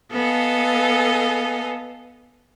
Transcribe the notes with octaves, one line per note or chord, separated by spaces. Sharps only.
B3 A4 D#5 F5 G#5